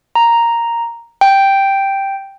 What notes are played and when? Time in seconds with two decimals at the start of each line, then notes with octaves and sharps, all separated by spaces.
0.15 A#5
1.21 G5